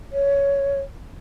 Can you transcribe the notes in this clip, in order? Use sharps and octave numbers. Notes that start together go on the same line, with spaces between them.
C#5